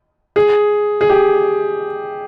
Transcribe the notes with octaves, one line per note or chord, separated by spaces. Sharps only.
G#4
G#4
G4